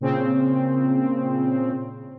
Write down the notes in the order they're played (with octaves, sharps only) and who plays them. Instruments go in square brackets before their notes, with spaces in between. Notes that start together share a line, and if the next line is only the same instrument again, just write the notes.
[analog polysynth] A#2 C#3 C4